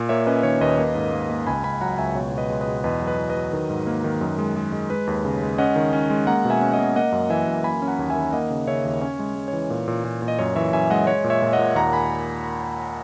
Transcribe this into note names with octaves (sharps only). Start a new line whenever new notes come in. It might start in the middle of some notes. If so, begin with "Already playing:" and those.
Already playing: A#2
A#3 C#5 E5
C#4 B4 D#5
D#3 C#5
D#2 B4 D#5
A#3
G#2
A#3
A#3
C#2 G#5 B5
C#2 G#5 B5
F#3 F#5 A#5
C#2 E5 G#5
B2 C#5
B2
B4 D#5
G#3
B4 D#5
B2
E2 B4 D#5
F#3
B4 D#5
E2
B4 D#5
F#3
D#3
G#2
A#3
D#3
F#2
G#3
G#3
G#3
G#3 B4
D#2
C#3
G#3
C#4 D#5 F#5
D#3
C#4
G#3
A#3 F#5 A#5
B2
E5 G#5
C#4
D#5 F#5
B2
A#3 D#5 F#5
F#2
E3 E5 G#5
F#2
A#3 G#5 B5
C#4
F#5 A#5
D#2
E5 G#5
D#3
A#3 D#5 F#5
C#3
C#3 C#5 E5
D#2
C#4 C#5
G#3
G#3
C#5
E3
A#2
A#2
A#2
A#2
D#5
F#2 C#5
E3 C#5 E5
F#2 E5 G#5
G#3 D#5 F#5
G#3 C#5
A#2
C#5 E5
A#2
D#5 F#5
A#2
D#2 F#5 A#5
G#5 B5